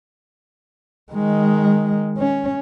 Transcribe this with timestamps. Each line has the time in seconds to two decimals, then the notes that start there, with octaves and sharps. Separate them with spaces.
1.13 D#3 G#3
2.17 C#4